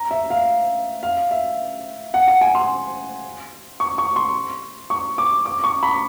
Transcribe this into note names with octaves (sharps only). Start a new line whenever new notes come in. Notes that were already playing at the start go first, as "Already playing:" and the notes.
Already playing: A#5
E5
F5
F5
E5
F#5
F#5
G#5
C6
C#6
C#6
C6
C#6
D6
D6
C#6
B5